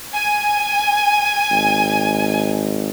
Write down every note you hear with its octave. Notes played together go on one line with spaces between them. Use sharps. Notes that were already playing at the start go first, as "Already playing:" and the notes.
G#5
G#1